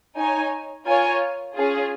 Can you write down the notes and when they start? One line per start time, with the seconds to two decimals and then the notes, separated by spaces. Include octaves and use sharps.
0.17 D#4 C#5 G#5
0.86 F4 A#4 C#5 G#5
1.55 C#4 F4 G#4